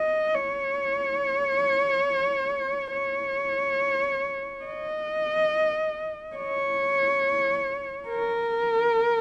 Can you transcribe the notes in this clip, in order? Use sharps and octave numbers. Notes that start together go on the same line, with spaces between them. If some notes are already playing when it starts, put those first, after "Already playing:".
Already playing: D#5
C#5
C#5
D#5
C#5
A#4